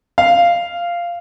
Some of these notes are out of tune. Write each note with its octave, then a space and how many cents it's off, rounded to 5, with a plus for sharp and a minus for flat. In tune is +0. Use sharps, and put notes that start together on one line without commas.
F5 -10